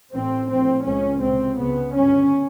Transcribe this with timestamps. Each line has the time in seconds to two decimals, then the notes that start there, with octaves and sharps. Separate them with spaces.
0.14 A1 A2 C4
0.50 A#1 A2 C4
0.85 C#2 C#3 C#4
1.22 C#2 C3 C4
1.58 C#2 C#3 B3
1.95 G1 G2 C#4